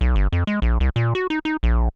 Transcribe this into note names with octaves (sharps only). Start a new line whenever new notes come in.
B1
G1
F2
G#3
A#1
C2
A#2
F#4
D#4
D#4
A#1